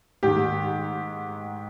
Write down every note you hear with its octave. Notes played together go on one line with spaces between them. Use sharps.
G#2 D#3 G4